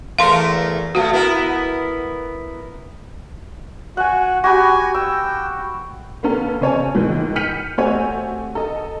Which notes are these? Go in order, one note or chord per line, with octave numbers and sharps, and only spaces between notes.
E2 A3 A#4 F5 C6
B2 A3 F#4 F5
B3 E4 A#4
F#4 F#5 G#5
F#4 G4 G#5 B5
G5 E6
A#3 B3 C#4 A4 F5
C#3 C4 C#5 G#5 A5
C#2 G#2 D#3 E3
F6 G6 B6 C#7 D#7 F7
A3 C4 F#4 G4 C#5 G#5
A4 D#5